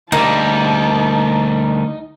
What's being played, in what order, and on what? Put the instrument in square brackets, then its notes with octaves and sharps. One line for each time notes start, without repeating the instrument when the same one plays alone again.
[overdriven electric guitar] D2 G3 [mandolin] A#3 [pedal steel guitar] D#4 [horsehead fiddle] A5